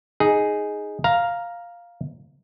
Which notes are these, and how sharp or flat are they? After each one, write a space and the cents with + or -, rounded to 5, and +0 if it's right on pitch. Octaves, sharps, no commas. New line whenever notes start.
D#4 +0 G#4 +0
F5 +0 A#5 +5